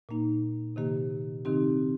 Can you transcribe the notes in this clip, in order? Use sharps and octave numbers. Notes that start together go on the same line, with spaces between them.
A#2 A#3 D#4
C3 D#3 A#3 G4
C3 D#3 C4 D#4 G4